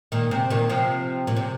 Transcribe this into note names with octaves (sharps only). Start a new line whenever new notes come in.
A#2 D#3
C3
A#2 D#3
C3 F3
A#2
C3